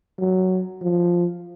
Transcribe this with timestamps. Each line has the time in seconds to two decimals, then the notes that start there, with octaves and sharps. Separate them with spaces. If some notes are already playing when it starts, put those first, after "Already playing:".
0.19 F#3
0.81 F3